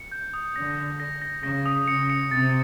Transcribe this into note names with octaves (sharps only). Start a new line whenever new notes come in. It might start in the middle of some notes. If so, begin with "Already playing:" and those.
Already playing: C#7
G6
D#6
D3 A#6
A#6
A#6
A#6
C#3 A#6
D#6
C#3 C#7
C#7
C3 A6